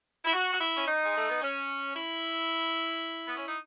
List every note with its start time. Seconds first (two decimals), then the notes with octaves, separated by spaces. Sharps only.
0.25 E4
0.33 F#4
0.53 F#4
0.59 E4
0.77 C#4
0.86 D#4
1.03 G#3
1.15 A3
1.29 B3
1.41 C#4
1.96 E4
3.27 B3
3.37 C#4
3.47 D#4